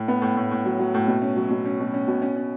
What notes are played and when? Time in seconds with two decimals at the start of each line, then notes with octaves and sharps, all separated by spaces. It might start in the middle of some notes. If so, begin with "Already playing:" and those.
Already playing: A2
0.08 B3
0.22 A2
0.37 A2
0.51 A2
0.66 F#3
0.79 F#3
0.94 A2
1.08 B2
1.22 C#4
1.36 F#3
1.50 B2
1.65 C#4
1.80 B2
1.94 C#4
2.08 B2
2.22 C#4
2.36 C#4